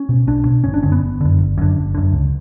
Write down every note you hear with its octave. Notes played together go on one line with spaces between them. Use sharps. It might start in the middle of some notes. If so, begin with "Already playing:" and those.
Already playing: C#4
B2
B1 D4
B2
G1 C#4
D4
F#2 D3 C#4
B3
G1
F#2 D3
G1
F#2 D3
G1
F#2 D3
C#2